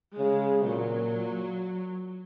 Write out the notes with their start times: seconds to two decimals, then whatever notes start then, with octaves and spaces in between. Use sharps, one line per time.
0.18 C#3 G#3
0.65 A#2 F#3